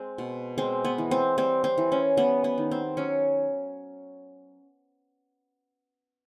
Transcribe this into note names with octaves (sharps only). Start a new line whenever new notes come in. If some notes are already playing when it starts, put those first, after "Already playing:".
Already playing: G#3 C4
B2
G#3 C4
B3
E3
C4
G3 C4
C4
E3
C#4
G3 B3
B3
D#3
C4
F#3 C#4